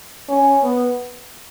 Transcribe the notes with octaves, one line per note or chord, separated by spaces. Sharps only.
C#4
B3